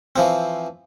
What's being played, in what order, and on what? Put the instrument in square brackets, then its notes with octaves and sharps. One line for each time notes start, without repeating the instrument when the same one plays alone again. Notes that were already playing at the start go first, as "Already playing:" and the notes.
[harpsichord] E3 F3 C4